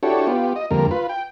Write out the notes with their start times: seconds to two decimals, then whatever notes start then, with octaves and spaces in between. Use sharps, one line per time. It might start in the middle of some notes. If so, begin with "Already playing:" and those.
0.03 D4 E4 F#4 G4 A4 C#5
0.27 B3 F4 G4
0.56 D#5
0.71 F2 D3 G3 A#3 A#4
0.91 F4 B4
1.09 G5